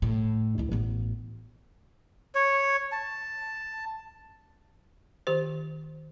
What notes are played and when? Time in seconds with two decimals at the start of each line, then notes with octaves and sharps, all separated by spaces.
0.02 A2
0.58 D2 E4
0.72 A1 B3
2.35 C#5
2.92 A5
5.27 D#3 G4 C5